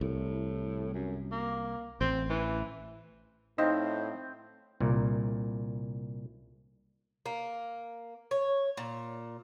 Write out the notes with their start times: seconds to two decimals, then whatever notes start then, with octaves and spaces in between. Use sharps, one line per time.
0.01 C2 A2
0.94 F#2
1.32 A#3
2.01 A1 C4
2.30 E3
3.58 A2 C4 D#4 D#5 F5
4.80 C2 A#2
7.26 A#3
8.31 C#5
8.77 A#2